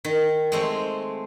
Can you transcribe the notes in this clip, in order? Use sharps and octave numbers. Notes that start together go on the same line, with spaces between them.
D#3
G#3 A3 C4